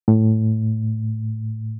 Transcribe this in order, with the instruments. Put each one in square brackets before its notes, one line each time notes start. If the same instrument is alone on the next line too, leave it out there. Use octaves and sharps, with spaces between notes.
[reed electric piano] A2